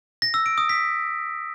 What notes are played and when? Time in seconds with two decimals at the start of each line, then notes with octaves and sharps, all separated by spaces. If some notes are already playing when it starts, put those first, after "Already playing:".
0.22 A#6
0.34 E6
0.46 D7
0.58 D#6
0.69 B6